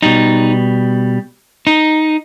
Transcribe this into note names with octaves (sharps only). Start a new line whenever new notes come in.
B2 G3 D#4
D#4